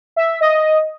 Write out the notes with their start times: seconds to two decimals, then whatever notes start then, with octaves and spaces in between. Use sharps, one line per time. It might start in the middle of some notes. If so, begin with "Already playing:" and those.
0.16 E5
0.41 D#5